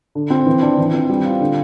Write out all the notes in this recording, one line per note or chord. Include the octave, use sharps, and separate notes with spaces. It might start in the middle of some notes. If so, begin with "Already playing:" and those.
D3
C4
E3
D4
E3
C4
G3
F4
D3